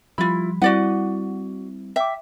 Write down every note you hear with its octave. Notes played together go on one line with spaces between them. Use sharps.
F3 G3 E4 F4 B5
G3 C4 E4 F#4 D5 F#5
E5 G5 D6